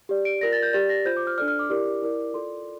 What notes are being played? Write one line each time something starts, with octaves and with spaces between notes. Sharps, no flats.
G4 D5
D7
F4 A#4 D5 A#6
A6
G6
G4 D5 A6
A#6
F4 C5 G6
D6
F6
D4 A4 D5 F6
F6
D6
E4 G4 A#4 D5
E4 A#4 D5
F4 A4 D5 C6